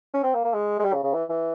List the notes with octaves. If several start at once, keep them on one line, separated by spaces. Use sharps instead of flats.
C#4
C4
A#3
A#3
G#3
G#3
G3
C#3
C#3
E3
E3